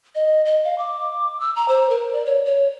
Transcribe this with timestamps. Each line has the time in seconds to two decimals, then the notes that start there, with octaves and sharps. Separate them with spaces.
0.15 D#5
0.45 D#5
0.64 F5
0.78 D6
1.40 E6
1.56 A#5
1.68 C5
1.90 A#4
2.13 D5
2.26 C#5
2.45 C#5